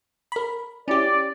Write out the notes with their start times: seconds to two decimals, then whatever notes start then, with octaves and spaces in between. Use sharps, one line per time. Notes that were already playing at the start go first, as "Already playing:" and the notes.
0.32 A#4 B5
0.88 C#4 E4 G4 D5